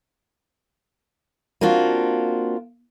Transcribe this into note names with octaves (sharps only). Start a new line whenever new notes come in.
A#3 C4 D4 F4 F#4